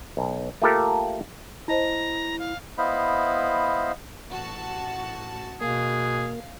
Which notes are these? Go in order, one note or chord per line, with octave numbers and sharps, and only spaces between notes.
B1
A3 A#3 F4 G4 A4 A#4
E4 C5 D#5 A5 A#5
F5
B3 E4 C5 D#5 F5 B5
A1 F#4 A5
B2 A#3 G#4 F5